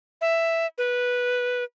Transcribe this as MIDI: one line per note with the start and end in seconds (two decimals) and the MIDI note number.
0.21 0.66 76
0.78 1.64 71